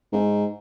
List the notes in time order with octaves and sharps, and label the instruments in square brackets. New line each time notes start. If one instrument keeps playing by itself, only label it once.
[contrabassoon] G#2